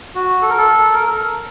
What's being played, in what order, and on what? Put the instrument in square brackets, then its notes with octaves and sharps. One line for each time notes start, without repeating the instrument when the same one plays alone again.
[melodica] F#4
A4
A#4
A4
A#4